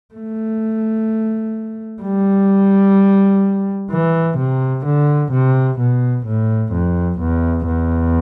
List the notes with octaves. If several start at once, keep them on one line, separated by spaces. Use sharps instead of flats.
A3
G3
E3
C3
D3
C3
B2
A2
F2
E2
E2